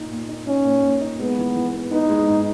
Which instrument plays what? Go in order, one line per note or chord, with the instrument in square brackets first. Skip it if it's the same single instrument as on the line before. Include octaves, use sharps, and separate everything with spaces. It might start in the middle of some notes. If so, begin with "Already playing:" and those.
Already playing: [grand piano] A#2 D#4
A#2
D#4
[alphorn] C#4 [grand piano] D#4
[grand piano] A#2
A#2
D#4
[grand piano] G#3 [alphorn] B3
[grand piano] E3
E3
B3
[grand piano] B3 [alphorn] D#4
[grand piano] G#3
G#2